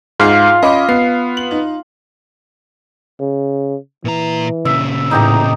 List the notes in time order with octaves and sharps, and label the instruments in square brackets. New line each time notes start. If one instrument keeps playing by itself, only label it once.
[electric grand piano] G#2 F6 C7 [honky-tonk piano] D#4 G#4 [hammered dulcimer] F4
[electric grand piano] C#4 B5 D6 [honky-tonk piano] D#5
[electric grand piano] B3 [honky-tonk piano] C7
[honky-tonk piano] F#7
D#4
[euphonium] C#3
[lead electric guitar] A#2 A#5 [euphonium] E3
[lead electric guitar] A#2 C#3 [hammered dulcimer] E5
[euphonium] E2 [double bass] A2 [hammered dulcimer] D#4 G4 A#5